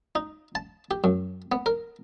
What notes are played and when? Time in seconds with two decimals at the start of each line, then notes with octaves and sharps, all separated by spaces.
0.15 D#4
0.55 A5
0.91 G4
1.04 F#2
1.52 B3
1.66 A#4